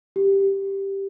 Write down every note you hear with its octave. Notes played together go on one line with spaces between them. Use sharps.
G4